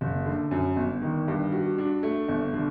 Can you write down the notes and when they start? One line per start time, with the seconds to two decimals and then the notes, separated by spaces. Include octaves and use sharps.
0.01 F#1
0.26 D3
0.51 F#2
0.76 G1
1.02 D#3
1.28 G2
1.52 F#4
1.78 D4
2.03 A3
2.28 G1
2.54 D3